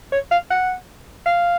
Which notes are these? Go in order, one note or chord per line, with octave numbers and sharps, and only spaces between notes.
C#5
F5
F#5
F5